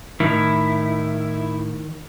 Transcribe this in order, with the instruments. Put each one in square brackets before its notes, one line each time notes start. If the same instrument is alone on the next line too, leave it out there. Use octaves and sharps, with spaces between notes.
[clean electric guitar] A2 [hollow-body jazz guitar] D#3 [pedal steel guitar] E4